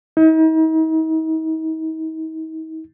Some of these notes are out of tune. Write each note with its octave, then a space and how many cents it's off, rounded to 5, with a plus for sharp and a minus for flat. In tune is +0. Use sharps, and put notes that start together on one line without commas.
D#4 +45